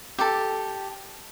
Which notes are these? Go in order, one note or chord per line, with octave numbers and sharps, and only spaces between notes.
G4 A4